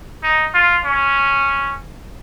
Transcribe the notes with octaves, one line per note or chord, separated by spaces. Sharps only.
D#4
F4
C#4